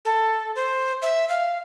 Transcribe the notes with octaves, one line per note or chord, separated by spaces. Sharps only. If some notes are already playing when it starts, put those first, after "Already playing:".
A4
C5
E5
F5